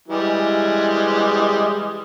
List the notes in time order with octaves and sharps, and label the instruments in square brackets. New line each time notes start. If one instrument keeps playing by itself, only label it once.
[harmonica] E3 G3 G#3